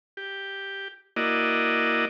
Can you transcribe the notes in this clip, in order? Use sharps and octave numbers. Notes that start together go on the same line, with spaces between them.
G4
A#3 E4 F#4 D5 D#5